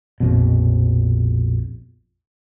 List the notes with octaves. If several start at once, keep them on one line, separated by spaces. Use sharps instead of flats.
A#1 F2 B2